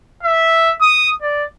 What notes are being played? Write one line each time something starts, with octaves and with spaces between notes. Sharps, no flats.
E5
D#6
D5